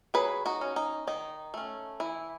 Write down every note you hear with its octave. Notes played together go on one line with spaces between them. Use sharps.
F#3 G#4 B4
D#4 F#4
C#4
D#4
D#3 D#4
A3 C#4
E3 E4